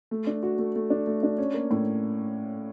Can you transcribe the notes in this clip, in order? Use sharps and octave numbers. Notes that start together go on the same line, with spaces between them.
A3
D4
F#4
A3
A3
D4
A3
D4
C#4
A#3
A2